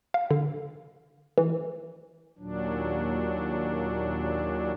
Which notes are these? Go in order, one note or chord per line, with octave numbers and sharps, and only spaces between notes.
F5
D3
E3
D#2 A#2 F#3 D4